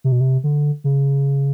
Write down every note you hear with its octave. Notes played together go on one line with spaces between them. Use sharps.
C3
B2
C3
D3
C#3